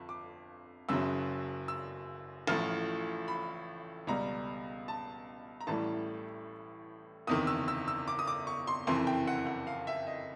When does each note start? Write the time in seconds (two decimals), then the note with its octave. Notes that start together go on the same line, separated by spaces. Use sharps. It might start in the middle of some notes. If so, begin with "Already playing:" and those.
Already playing: G1 F2 F3
0.09 D6
0.89 F#1 F#2 C#3 F#3 E6
1.68 E6
2.47 A1 A2 F3 F6
3.28 B5
4.07 C#2 B2 G3 A#5
4.88 A5
5.61 A#5
5.67 A1 A2 E3 G3 A5
7.27 F#1 E2 C3 D#3 D#6
7.47 E6
7.68 E6
7.88 E6
8.08 D6
8.19 D#6
8.27 D6
8.47 C#6
8.67 C6
8.87 F#1 F2 C3 E3 C6
9.07 G5
9.27 F#5
9.47 F#5
9.67 F5
9.87 E5
10.07 D#5